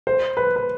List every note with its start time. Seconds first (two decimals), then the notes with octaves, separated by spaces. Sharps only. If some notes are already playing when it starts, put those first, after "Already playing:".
0.07 C5
0.37 B4
0.56 B4